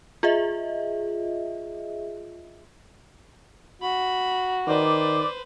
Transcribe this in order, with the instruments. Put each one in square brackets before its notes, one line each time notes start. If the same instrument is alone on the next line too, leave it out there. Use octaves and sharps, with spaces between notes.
[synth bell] F4 G#4 D#5 E5
[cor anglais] F#4 [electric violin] B5
[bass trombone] D#3 [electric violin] B4 C5 [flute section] D5 D6